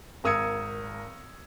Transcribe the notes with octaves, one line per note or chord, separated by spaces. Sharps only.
G#1 A#4 D#6 E6 G#6 C#7